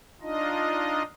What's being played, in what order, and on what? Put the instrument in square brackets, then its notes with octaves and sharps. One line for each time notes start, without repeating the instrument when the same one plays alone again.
[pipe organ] D4 D#4 F4 D#5